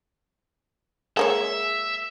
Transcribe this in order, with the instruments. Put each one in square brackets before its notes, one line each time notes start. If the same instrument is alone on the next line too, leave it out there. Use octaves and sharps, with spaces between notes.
[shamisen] G#3 A#3 C#5 [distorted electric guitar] E5